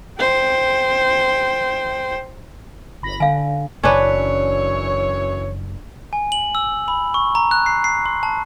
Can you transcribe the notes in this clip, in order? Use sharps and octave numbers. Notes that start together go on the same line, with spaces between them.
C5 G5
G1 B5 A#6
D3 F5 G#5
F#1 F#2 E3 C#4 D4 B4 C#5
G#5
F#7
E6
B5
C#6
A#5
F#6
C7
C7
C6
A5